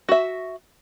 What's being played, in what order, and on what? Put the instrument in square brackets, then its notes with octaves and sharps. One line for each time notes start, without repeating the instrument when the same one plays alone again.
[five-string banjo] F#4 E5